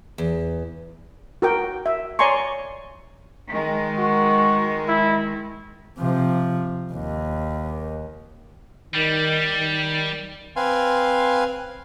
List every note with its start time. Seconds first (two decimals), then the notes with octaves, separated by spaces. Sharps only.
0.18 E2
1.42 F#4 A#4 G5
1.86 E5
2.19 C#5 D5 G#5 A#5 C6 C#6
3.51 D#3 G#3
3.98 F#4
4.88 E4
5.98 C3 F3
6.92 D#2
8.94 D#3 G3
9.59 D#3
10.56 C4 B4 F5 G#5 C6